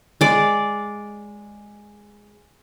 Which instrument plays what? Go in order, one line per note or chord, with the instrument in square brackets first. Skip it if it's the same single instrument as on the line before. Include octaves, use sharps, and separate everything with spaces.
[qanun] G#3 D5 D6